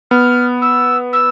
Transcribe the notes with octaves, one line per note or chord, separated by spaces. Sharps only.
B3 F6
E6
E6